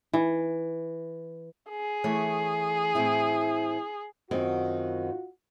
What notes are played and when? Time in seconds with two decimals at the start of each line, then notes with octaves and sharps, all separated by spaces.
0.13 E3
1.70 G#4
2.04 E3 A3 C#5
2.95 A2 C4 E4
4.31 F#2 D#3 C4 F4 F#4